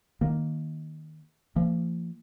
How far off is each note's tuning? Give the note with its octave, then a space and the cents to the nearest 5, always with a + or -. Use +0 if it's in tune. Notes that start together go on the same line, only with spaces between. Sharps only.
D#3 +0 A#3 +0
F3 -40 A#3 -35